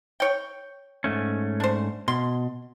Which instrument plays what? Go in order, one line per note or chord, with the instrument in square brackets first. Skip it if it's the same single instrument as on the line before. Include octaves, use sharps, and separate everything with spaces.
[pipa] C#5 G5
[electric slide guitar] G#2 A3 C#4
[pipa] D4 C5
[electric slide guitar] B2 [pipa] C6